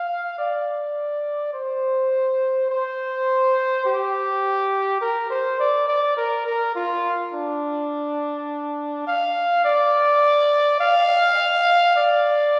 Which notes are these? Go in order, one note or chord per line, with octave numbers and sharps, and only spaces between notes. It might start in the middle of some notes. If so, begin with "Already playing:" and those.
Already playing: F5
D5
C5
C5
G4
A#4
C5
D5
D5
A#4
A#4
F4
D4
F5
D5
F5
D5